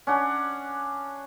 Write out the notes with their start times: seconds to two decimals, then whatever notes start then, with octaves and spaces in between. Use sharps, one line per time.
0.07 C#4 D4 F#5